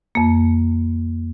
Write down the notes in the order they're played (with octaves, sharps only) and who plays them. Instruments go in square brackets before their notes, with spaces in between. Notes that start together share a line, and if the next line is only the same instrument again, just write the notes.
[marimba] F2 A#3